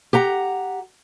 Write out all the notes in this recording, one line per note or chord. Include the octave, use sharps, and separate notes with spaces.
G4 F#5 A#5